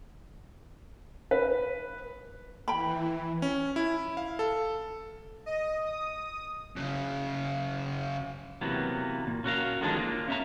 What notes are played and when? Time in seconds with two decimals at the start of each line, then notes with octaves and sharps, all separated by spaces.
1.31 B4
2.68 E3 G5 B5
3.42 C#4
3.76 E4
4.17 F5
4.39 A4
5.46 D#5
5.87 D#6
6.76 F#2 C#3
8.61 C3 E3 F#3 A#3 B3
9.27 A#2
9.44 C#4 F#4 A#4 F5
9.81 D3 D#3 F3 G#3 C#4 D4
9.97 A#3 F4
10.28 C#4 E5 A#5